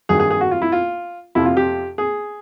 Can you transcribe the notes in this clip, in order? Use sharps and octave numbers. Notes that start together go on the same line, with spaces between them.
G2 D#3 F#3 G#4
G#4
G#4
F#4
F4
E4
F4
F2 C3 F3 E4
F4
G4
G#4